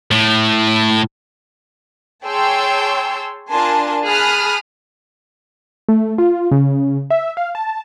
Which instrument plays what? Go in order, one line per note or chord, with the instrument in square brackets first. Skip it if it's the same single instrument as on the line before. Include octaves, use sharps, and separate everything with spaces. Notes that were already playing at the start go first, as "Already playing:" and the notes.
[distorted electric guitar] A2
[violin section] G#4 C#5 G5 A5 C6 E6
D4 F4 A#4 G#5 A5 C6
G#4 A5 B5 D#6 F6 F#6
[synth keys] A3
F4
C#3
E5
F5
A5